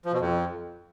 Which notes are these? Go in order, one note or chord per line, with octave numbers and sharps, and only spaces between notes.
F3
B2
F2